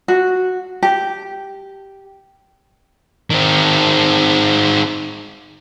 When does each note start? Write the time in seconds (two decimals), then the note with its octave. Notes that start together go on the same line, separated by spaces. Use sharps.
0.08 F#4
0.83 G4
3.30 D#3 C4